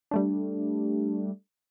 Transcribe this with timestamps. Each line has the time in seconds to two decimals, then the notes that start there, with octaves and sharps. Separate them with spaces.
0.11 G3 A3 D4